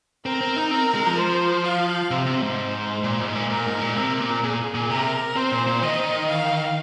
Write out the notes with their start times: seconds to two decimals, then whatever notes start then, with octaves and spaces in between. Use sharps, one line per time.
0.25 C4 A#4
0.41 C4
0.56 D#4
0.71 C4 A#4
0.95 G#3
1.06 F3
1.18 C5
1.65 F5
2.11 C3 C5
2.26 C3
2.41 G#2
3.04 A#2
3.20 G#2
3.35 A#2
3.50 A#2 A#4
3.66 G#2
3.81 A#2
3.96 C3 A#4
4.20 A#2
4.43 A#2 G#4
4.75 A#2
4.90 C3 A#4
5.36 C4 C5
5.52 A#2
5.67 A#2
5.82 D#3 D#5
6.29 F5